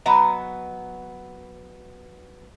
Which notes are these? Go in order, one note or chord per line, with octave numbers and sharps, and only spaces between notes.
F#3 B3 B4 D#5 A#5